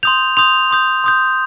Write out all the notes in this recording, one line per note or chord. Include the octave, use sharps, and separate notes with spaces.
C6 D#6 G6 F7
C6 D#6 G6 F7
C6 D#6 G6
C6 D#6 G6